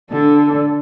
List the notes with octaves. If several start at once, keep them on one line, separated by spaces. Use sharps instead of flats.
D3 D4 A4